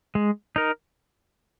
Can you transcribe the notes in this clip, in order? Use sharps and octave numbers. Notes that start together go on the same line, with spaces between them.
G#3
D#4 A#4